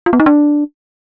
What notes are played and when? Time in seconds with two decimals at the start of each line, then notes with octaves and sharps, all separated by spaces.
0.06 F4
0.13 B3
0.20 D#4
0.26 D4